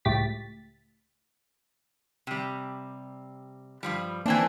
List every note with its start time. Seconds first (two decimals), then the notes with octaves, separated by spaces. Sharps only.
0.05 C#2 A2 G4 A6 B6
2.27 C3 G3
3.83 G2 F3 G3
4.26 E3 A#3 C4 D4 G#5